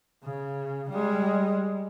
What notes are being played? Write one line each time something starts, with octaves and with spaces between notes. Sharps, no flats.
C#3
G3 G#3